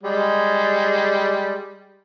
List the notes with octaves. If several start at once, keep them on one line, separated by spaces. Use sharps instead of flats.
G3 G#3